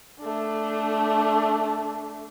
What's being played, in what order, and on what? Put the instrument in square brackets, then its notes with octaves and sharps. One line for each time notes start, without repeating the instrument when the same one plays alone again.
[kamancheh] A3 D4